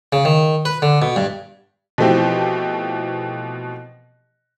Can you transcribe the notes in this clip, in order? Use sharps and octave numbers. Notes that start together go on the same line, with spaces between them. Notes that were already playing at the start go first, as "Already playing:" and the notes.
C#3
D#3
B4
D3
B2
G2
B2 E3 F3 A3 C4 G4